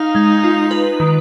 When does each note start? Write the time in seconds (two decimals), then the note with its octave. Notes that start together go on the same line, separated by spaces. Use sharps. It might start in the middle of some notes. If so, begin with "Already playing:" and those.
Already playing: D#4 F5
0.15 G#3
0.44 F4
0.71 B4
1.00 D#3